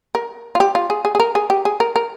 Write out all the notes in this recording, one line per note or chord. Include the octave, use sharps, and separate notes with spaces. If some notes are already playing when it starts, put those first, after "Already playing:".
A#4
F4
G4
F4
G#4
G#4
G#4
A#4
G#4
G4
G#4
A#4
A#4